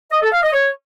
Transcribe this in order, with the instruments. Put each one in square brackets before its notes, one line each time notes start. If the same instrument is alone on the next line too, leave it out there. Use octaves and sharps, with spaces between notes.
[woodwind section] D#5
A4
F5
D#5
C#5